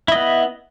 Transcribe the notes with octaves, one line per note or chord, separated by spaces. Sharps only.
B3 E4 D#5